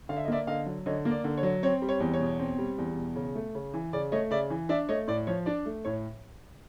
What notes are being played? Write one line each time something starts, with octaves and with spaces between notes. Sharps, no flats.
D3 F5
E5
D#5
A#3 D5 E5
D3 D#5 F5
F#3
D3 C#5 D#5
A#3
D5
D3
C#5
F#3
C4 C#5
G3
C#5
E2
C#5
B2
C4
G3
E2
B2
C#3
A3
C#3
E3
C#3 D5
A3 C#5 D#5
C#3 D5 E5
E3
D4 D5 E5
A3 C#5 D#5
A2 D5
F3 C#5
D4 D5
A3
A2 C#5